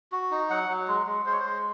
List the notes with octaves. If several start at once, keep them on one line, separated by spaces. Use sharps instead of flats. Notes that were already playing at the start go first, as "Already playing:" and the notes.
F#4
D#4
F#3 F#5
F#3
G#3
G#3
G#3 C5
C#5
C5
G#3